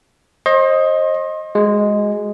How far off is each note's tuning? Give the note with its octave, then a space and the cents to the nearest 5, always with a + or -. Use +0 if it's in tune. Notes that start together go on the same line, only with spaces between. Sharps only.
C5 +30 D#5 +5 C6 +40
G#3 +0 F#4 +0